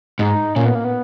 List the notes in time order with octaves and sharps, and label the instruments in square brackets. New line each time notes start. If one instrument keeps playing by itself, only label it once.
[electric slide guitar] G#2 [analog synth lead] D#4
[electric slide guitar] A#2 [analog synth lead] C#4
[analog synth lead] B3
A#3
B3